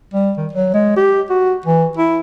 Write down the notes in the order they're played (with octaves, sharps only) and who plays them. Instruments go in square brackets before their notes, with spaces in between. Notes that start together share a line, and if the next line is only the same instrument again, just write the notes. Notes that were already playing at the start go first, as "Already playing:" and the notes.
[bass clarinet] G3
D#3
F#3
G#3
G4
F#4
E3
E4